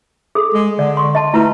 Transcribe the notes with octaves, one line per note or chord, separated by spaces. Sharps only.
G#4 A4
G#3
D3 D5
C6 C#6
D#5 A5 C6
A3 E4 F4 B4